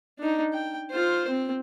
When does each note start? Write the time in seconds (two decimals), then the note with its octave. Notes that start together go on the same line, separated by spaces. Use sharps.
0.19 D4 D#4
0.53 G5
0.91 F4 C5
1.29 C4